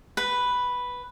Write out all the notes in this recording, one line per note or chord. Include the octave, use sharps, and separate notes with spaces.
B4